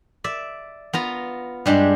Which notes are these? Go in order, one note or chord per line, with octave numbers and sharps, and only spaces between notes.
D5 E5
B3 F4 A#5
G2 G3 G#3 D4